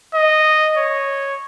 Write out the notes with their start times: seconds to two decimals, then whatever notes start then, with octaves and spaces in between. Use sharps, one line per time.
0.15 D#5
0.78 C#5